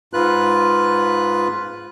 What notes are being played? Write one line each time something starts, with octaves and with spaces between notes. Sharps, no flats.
G#2 F4 B4 F#6